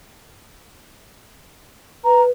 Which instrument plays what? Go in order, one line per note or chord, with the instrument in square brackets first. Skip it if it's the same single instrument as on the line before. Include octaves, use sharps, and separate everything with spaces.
[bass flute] B4 [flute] A#5